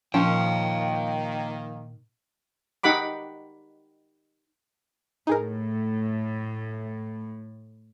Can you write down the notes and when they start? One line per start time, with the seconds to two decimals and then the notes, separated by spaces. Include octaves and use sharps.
0.14 A#2 D#3 F3 A#3 C#4 F5 G5
2.83 D#4 G4 F#5 B5 D6
5.27 A2 D#4 G#4 A#4